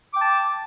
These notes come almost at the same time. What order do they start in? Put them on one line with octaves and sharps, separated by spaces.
D6 G5 A5